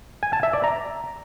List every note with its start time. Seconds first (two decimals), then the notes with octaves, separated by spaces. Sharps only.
0.23 G#5
0.33 A5
0.43 E5
0.53 D5
0.64 A#5